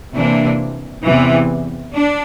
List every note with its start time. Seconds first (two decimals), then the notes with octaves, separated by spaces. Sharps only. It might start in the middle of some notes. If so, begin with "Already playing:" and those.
0.14 C3 E3 A#3 D4
1.04 E2 C3 E3
1.94 D4